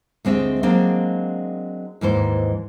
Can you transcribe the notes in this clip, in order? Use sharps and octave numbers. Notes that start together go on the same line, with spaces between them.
D2 G#3 C4 G4 E5
F#3 G#3 A#3 C4 D4
D#2 G#2 E3 C5